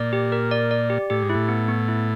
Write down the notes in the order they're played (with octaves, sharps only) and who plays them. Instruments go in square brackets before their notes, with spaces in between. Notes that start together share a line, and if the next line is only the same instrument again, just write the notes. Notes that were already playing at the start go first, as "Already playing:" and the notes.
Already playing: [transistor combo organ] A#2 [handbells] D5
[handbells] G4
A#4
D5
D5
G4
[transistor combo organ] A2 [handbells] G4
[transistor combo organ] G#2
[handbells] E4
[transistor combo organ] A2
[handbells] B3
B3
E4